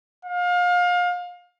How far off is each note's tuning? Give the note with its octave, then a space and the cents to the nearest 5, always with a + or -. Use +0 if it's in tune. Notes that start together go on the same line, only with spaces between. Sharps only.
F5 +30